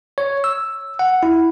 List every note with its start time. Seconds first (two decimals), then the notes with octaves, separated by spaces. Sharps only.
0.18 C#5
0.44 E6
0.99 F#5
1.23 E4